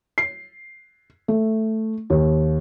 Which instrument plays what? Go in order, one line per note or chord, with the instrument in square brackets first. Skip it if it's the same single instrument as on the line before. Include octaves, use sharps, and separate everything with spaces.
[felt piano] C7
A3
D#2